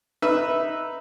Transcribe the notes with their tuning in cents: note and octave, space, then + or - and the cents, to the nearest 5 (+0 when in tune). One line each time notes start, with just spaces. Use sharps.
D#4 +0 B4 +0 E5 -5